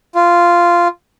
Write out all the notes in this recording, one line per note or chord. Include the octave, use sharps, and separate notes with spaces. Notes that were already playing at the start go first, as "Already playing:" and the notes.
F4